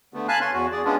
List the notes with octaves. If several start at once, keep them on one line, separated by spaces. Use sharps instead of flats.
D3 A3 B3
F5 G#5 A5 B5 F#6
C#5 G#5 C6
E2 F#4
G#4 D5
G#3 B3 C#4 D4 F4